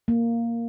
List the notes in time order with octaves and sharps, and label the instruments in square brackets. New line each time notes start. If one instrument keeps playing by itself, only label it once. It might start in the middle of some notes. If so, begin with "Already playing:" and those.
[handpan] A#3